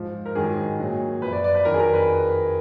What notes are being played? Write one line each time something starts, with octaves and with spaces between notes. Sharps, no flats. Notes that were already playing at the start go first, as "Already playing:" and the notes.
Already playing: G#2 F3
A#4
G#2 D#3 F#3 G#4
A#2 F#3
F3 B4
F#2
D5
D5
B4
F2 D#3 F#3 A#4
G#4
A#4
B4